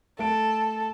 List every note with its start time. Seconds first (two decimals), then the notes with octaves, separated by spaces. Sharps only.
0.19 A3 A4 D7